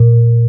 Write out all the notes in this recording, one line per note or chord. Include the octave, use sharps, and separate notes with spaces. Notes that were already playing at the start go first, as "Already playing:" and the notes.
Already playing: A#2